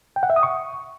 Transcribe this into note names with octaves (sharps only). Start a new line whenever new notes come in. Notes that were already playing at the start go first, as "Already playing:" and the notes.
G5
F#5
E5
D#6
C#6